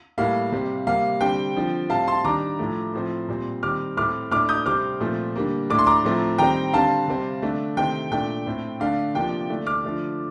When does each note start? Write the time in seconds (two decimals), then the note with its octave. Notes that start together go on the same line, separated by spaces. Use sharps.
0.18 A2 G3 A#3 F5
0.52 C3 G3 C4
0.87 C3 G3 A#3 F5
1.21 D3 G3 C4 G5
1.56 D3 F3 C4
1.90 A2 G3 C4 F5 A5
2.07 A5 C6
2.25 D#3 G3 D4 A#5 D6
2.59 A2 F3 A3
2.94 A2 F3 C4
3.29 A#2 G3 C4
3.63 D#3 G3 C4 D6 F6
3.97 A2 A3 C4 D6 F6
4.31 A2 A3 D4 D6 F6
4.49 D#6 G6
4.66 C3 G3 C4 D6 F6
5.00 A#2 F3 A3 C4
5.36 D3 G3 A#3
5.70 A2 A3 D4 D6
5.79 C6
5.87 A#5 D6
6.04 A2 F3 A3 C4
6.38 D#3 G3 C4 G5 A#5
6.73 D3 G3 C4 F5 A5
7.08 C3 G3 C4
7.42 D3 A3 D4
7.77 C3 D#3 A3 C4 G5
8.11 A#2 A3 D4 G5
8.46 A2 A3 C4
8.80 D3 A3 D4 F5
9.14 C3 F3 A#3 D4 G5
9.50 D3 A3 D4
9.66 D6 F6
9.84 D3 F3 A3 D4